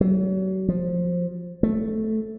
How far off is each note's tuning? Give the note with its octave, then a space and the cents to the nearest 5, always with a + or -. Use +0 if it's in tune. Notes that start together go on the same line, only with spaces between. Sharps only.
F#3 +40
F3 +10
A3 -5